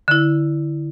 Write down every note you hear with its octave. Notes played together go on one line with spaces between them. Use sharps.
D3 E4